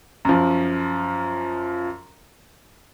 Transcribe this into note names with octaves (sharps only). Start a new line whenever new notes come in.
F#2 F3